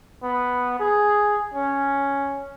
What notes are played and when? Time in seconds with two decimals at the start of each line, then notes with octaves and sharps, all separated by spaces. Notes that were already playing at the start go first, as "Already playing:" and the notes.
0.23 B3
0.79 G#4
1.54 C#4